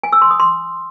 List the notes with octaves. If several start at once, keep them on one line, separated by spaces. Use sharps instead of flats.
G#5
E6
C6
D#6
C6